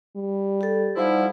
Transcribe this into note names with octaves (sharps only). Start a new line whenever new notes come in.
G3
G4 A4
F3 G3 D#4 E4 F#5